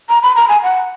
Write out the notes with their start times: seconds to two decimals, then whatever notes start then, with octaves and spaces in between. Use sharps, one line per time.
0.09 A#5
0.23 B5
0.36 A#5
0.49 G#5
0.63 F#5